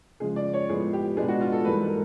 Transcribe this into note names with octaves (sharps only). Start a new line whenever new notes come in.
C#3 F3 G#3 G#4
D5
C#5
A2 F3 G#3 B3 G#4
G4
B2 G#3 B3 D4 G#4
F#4
F4
A4
G#2 E3 G3 A#3 B4
A4
A#4